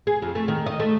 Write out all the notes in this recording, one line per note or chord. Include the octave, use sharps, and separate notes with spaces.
G#4
F2
A3
D#3
D#5
A3